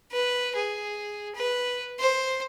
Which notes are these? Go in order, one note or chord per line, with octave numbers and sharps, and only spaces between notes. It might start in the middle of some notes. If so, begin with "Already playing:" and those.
B4
G#4
B4
C5